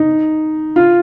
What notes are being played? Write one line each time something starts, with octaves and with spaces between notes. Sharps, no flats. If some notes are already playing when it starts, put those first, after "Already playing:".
Already playing: D#4
F4